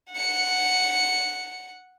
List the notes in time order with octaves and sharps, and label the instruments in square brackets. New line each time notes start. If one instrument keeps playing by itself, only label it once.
[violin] F#5 C#7